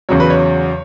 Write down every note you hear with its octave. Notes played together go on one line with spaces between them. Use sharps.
E2 C#3 F#3 C#5
B4
C#5